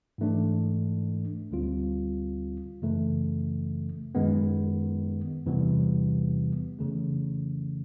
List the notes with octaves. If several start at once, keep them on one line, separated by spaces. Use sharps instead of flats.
G#2 E3 A3 D4
D2 D3 G3 C4 F4
F#2 C#3 E3 A3
F#2 D#3 G#3 B3
E2 C3 E3 G3 B3
F2 C#3 E3 A3